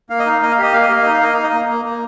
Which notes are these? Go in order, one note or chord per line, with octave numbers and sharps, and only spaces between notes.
A#3 F5
D#5
D#4 F5
A#3 D#5
F5
G4 D#5
A#3 F5
D#5
A#3 F5
D#4 D#5
F5
A#3 D#5
D#4 F5
D#5
A#3
A#3
A#3